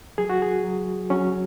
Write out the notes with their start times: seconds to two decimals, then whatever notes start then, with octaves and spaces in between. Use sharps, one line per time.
0.18 F#3 G#4
0.30 F#4
0.42 G#4
0.64 F#3
1.10 F#3 C#4